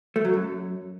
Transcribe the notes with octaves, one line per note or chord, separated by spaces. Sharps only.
A3
F#3
F#2